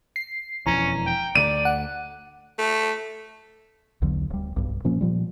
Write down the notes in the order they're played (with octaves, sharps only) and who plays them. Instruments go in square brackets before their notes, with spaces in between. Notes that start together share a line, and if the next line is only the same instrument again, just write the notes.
[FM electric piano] C7
[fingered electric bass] E1 F2 E3 [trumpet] C#4 [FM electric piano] A#5
[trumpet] G5
[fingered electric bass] D2 D3 [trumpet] D5 [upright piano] D#7
[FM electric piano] F#5
[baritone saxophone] A3
[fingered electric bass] B1 E2 D3 F#3
D1 G3
B1 G2
A#2 F3 A#3 C#4
A#2 F3 G3